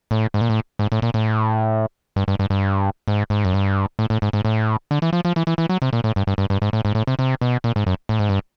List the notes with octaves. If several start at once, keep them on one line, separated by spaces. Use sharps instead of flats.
A2
G#2
A#2
A2
G#2
A2
A#2
A2
G2
G2
G2
G2
G#2
G#2
F#2
G2
A2
A2
G#2
G#2
A2
D3
E3
F3
F3
E3
E3
E3
F#3
C3
A#2
A2
G2
G2
G2
G2
G#2
A2
G#2
A2
C3
C3
B2
A#2
G#2
F#2
A2
G#2
G2